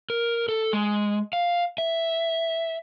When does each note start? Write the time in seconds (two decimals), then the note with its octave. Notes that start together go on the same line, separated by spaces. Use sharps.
0.10 A#4
0.49 A4
0.73 G#3
1.33 F5
1.78 E5